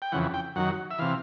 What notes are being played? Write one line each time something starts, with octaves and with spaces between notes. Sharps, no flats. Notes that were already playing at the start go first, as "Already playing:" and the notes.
G5
F2 C#3 E3 F#5
G5
F#2 D#3 F#3 F#5
E5
C3 E3 F5